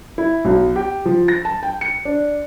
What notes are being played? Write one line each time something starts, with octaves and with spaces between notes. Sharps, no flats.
E4
B1
G4
F3
A#6
A5
G5
C#7
D4